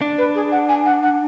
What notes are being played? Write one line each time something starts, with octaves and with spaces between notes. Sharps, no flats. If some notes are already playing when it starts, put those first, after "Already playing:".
D4
B4
G#4
F#5
G#5
F#5
F#5